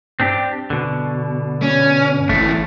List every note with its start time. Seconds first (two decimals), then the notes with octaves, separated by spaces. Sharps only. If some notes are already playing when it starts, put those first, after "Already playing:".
0.20 G2 C4 D4 G4
0.70 B2 D3
1.62 C#4
2.29 G#1 G#2 E3 A3